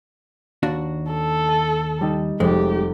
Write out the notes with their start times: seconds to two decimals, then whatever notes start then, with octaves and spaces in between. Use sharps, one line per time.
0.63 D#2 D4 F#4
1.12 A4
1.48 A5 D#7
2.01 G3 D#4
2.40 F1 G#3 G4